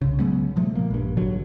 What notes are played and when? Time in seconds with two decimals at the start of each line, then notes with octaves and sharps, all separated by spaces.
0.02 C2 C#3
0.19 C#3 F#3 G#3 B3
0.56 B2 F3 G3 A3
0.75 A#2 A#3
0.91 A#1 G2
1.17 G#1 D3 F#3